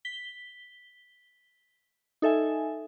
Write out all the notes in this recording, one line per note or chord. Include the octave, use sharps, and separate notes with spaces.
B6 G7
D#4 A4 E5 G#5